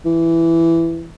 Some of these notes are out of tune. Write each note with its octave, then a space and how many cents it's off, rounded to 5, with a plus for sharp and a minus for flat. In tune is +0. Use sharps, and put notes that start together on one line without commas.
E3 +10